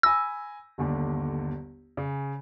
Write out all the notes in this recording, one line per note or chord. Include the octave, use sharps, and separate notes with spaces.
G#5 B5 E6 A#6
G1 D#2 D3
C#3